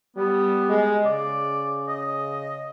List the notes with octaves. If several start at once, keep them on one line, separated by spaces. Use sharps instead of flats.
G3 B3
G#3
C#3 D5
D#5